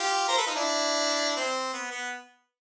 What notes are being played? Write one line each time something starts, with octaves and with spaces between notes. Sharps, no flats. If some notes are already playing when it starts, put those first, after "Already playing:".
Already playing: F4 G4
A#4 C5
A4 B4
D#4 F4
D4 E4
C4
B3
B3